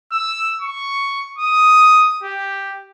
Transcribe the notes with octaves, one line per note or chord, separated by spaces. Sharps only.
E6
C#6
D#6
G4